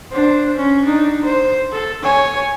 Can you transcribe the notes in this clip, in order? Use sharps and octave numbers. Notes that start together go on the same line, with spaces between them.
D4 C5
C#4
D4 D#4
C5
A4
C#5 G#5